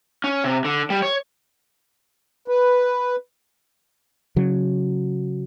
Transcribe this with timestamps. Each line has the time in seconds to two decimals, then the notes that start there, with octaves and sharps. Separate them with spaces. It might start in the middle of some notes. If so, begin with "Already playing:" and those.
0.24 C#4
0.44 C3
0.65 D3
0.90 G3
1.02 C#5
2.48 B4
4.36 C#3 F#3